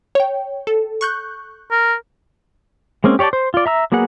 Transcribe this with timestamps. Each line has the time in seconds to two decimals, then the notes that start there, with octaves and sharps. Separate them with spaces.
0.15 C#5 G5
0.67 A4
1.01 C#6 F#6 G6
1.71 A#4
3.04 G#3 A#3 C4 C#4
3.19 G4 C#5 D5 G5 A5
3.33 C5
3.54 F4 D5
3.66 E5 A#5 E6
3.92 F#3 A#3 B3 G#4 F#5